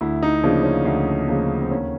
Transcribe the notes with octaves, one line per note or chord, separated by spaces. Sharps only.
D2 E4
D#4
C#3 F3 A#3 D4
C#4
D2
C#3 F3 A#3
C4
D#2 C#4